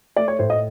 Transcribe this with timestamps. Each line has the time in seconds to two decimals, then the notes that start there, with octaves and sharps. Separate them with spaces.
0.16 A3 D5
0.28 C#5
0.39 A2 C5
0.50 D#5